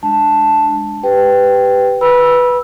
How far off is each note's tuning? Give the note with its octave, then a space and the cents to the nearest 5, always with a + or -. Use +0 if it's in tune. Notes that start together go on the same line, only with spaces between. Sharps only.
G#3 +0 D4 +0 A5 +0
G4 +0 B4 +15 G5 +0
B4 -5 B5 -25 E6 +0